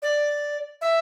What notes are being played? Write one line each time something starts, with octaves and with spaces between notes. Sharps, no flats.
D5
E5